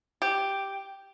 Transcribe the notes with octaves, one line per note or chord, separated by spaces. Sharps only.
G4